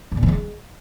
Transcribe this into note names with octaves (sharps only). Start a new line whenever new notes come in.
G#2
A#2
E3
G#3